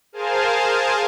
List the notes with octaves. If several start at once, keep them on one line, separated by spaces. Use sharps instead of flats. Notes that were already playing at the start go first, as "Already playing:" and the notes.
G#4 A#4 C5 F5 G#5 A5